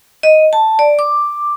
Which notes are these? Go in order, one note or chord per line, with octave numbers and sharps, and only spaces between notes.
D#5
A5
D5
D6